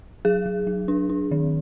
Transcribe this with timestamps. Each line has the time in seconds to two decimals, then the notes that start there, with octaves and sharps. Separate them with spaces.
0.25 F#3 G#4
0.46 F#3
0.67 F#3
0.88 D4
1.10 D4
1.31 D#3